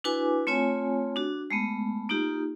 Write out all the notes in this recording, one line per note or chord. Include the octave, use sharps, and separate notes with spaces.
D4 E4 F#4 B4 G#5 D6
A3 C4 F4 C#5 G#5
D4 F#4
G#3 A3 B3
A#3 D#4 F4 G4